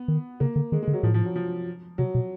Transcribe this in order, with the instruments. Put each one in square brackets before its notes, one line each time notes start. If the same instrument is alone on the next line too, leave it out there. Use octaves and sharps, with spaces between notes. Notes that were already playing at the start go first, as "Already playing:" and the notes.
Already playing: [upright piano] B3
[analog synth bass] D#3
[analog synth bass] C#3 [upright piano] A#3
[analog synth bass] D3
[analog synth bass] D#3 [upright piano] G#3
[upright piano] G#3
[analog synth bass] D3
[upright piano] F#3
[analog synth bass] A2 [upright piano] F3
[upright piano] F3
F#3
F3
[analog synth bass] C3 [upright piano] F#3
[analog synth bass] B2